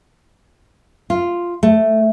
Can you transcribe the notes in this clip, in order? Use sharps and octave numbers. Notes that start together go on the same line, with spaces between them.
F4
A3